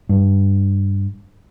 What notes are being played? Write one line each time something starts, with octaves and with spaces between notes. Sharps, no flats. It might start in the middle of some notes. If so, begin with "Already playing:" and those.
G2